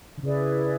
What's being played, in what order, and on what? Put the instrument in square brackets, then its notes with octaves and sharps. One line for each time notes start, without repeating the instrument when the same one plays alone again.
[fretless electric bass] D3
[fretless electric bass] C#3 [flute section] E4 G#4 B4 D5